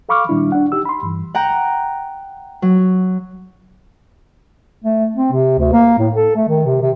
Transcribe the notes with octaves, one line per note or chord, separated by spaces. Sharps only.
A4 F5 B5 C#6 D6 F6
A#2 D#3 G3 D4 E4
D4 F#5
D#4 G4 E6
B5 C6
G2 E3
F#5 G5 A#5
F#3
A3
C4
C3
D2
A#3
A2
A4
A3
D#3
C3
C3